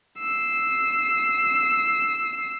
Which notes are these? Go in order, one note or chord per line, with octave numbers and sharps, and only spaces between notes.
E6 C7